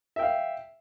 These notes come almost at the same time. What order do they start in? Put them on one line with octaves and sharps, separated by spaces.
E5 G5 F5